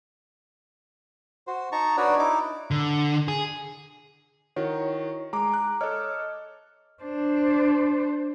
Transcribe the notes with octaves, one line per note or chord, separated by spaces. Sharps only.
F#4 C5
D#4 A5 A#5 C#6
D4 D#4 F#4 B4 C#5 D5
D#4 E4 D6
D3
G#4
D#3 E4 F#4 C#5
G#3 A#5 D6
F#6
A4 C#5 D#5 F6
D4 C5